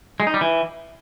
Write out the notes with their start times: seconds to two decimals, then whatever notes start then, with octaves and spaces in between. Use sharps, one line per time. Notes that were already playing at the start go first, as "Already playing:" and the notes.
0.20 G#3
0.27 D#4
0.34 G3
0.41 E3